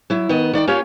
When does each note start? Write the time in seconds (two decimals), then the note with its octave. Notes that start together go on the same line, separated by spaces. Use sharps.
0.10 F#3 E4
0.29 D#3 B3 D#5
0.53 D#3 D5 F#5 G5
0.67 A#3 C#4 F4 G4 C#5 F5